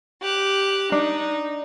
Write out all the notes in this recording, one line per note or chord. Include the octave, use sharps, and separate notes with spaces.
G4 F#6
D4 D#4